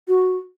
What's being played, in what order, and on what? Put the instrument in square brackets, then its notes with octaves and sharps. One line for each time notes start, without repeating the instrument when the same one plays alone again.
[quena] F#4